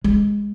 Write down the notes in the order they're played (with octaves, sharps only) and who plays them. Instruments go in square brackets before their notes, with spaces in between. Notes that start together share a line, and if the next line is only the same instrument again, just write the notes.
[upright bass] G#3